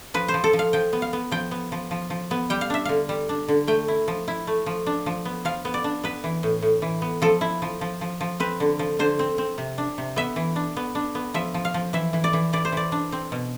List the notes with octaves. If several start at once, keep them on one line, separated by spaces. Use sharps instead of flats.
F3 B4
C5
F3
A4
F3
F5
F3 G5
B3
F5
B3
F3 G5
B3
F3
F3
F3
B3
G3 G5
F5
D4 E5
D3 F5
G3
D4
D3
A3 G5
E4
F3
E4
A3
F3
D4
F3
B3
F3 F5
B3
D5
D4
B3 B4
E3
A2
A2
E3
B3
F3 A4
E4
F3
F3
F3
F3
C4 B4
D3
F3
D3 C5
C4
C4
C3
D4
C3
B3 E5
E3
D4
B3
D4
B3
F3 E5
F3
F5
F3
E3 E5
E3
D5
E3
E3 D5
C5
E3 D5
D4
C4
B2